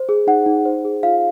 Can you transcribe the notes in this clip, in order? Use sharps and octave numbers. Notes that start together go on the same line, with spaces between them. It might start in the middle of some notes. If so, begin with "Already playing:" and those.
Already playing: C5
G#4
D#4 F#5
D#4
C5
G#4
F4 F5